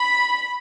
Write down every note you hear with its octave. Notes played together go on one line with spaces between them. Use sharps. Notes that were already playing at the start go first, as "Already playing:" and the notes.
Already playing: B5